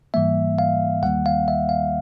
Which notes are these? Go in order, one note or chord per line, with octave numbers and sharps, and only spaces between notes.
G#2 E3 G3 A#3 E5
F5
D#2 D#3 G3 A#3 F#5
F5
E5
F5